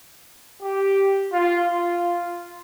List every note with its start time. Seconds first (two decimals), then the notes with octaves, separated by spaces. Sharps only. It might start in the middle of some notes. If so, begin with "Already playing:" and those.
0.62 G4
1.32 F4
1.67 F4